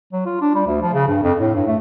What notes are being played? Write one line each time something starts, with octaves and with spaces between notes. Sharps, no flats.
F#3
F4
D4
G3
D2
F3
C#3
G2
F2
A2
G2
A3